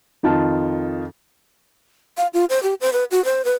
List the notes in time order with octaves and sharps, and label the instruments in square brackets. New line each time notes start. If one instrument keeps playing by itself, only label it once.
[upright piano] F2 D#3 F4 A5
[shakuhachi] F5
F4
C5
G4
C5
B4
F#4
C5
B4